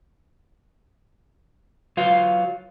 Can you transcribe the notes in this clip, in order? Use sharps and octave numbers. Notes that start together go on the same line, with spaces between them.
F#3 F4 B4 F5